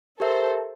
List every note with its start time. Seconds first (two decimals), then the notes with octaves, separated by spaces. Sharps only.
0.20 G4 A4 A#4 C5 E5